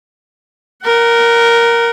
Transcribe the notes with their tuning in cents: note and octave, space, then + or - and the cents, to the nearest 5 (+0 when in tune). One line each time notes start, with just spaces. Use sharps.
A#4 +0 F#5 +30